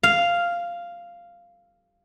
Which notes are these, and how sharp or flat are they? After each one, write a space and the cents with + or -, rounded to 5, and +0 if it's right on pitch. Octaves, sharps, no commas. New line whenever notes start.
F5 -5